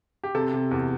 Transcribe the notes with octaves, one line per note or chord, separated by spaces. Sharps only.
G4
C3 A4
C3
E2